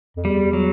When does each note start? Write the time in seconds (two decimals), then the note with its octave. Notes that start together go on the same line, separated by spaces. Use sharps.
0.17 F2
0.25 E2 G3
0.53 F#3